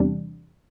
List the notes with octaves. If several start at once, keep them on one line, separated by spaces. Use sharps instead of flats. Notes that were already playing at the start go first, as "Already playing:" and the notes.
Already playing: E2 C3 G3 D4